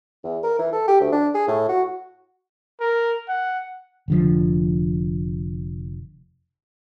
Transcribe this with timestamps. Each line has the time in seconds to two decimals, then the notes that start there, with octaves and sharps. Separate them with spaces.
0.24 E2
0.43 A#4
0.59 E3
0.72 A4
0.88 G4
1.00 D2
1.12 D4
1.34 G#4
1.47 A2
1.69 F#4
2.80 A#4
3.29 F#5
4.08 F1 D3 F3